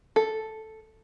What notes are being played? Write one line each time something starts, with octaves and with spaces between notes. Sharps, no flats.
A4